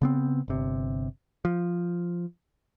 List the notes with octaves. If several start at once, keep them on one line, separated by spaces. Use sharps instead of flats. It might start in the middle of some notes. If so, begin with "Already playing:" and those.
C#3 B3 C4
G1 C3
F3